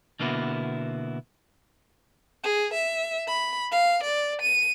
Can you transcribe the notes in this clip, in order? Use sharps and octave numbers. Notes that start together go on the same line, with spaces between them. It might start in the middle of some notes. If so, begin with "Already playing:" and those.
B2 D3 A#3 B3 E4 F#4
G#4
E5
B5
F5
D5
D#7